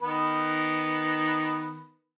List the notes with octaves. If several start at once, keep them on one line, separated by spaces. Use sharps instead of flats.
D#3 B3 B4